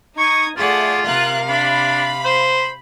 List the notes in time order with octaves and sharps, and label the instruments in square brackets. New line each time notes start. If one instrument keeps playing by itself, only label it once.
[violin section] D#4 D#6 G#6 [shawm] C#6
[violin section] A3 F#5 [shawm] F4 [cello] G#4 D5
[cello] C3 F5 [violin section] A#4 F#6
[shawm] D4 [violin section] B5
[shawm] C5